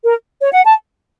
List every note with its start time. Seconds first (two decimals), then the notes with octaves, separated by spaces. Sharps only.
0.04 A#4
0.40 C#5
0.53 F#5
0.65 A5